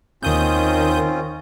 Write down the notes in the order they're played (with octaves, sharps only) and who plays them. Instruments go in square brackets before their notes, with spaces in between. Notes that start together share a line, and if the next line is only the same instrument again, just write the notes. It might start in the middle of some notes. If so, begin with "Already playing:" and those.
[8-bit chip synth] D#2 D#6 G6 [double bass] D#3 [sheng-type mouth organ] C4 C#4 F4